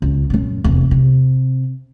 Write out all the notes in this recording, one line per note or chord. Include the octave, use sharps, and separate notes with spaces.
C#2
F#2 A#2
F1 E2
C3